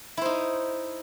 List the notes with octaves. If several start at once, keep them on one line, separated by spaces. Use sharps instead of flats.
D#4 E4 C5